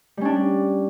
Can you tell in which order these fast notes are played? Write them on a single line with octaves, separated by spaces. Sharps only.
G3 C#4 D4